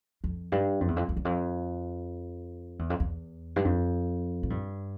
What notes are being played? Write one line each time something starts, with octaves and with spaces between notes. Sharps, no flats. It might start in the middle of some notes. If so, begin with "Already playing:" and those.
F2
G2
F2
E2
F2
F2
E2
F2
E2
F2
E2
G2
F2
A2
G2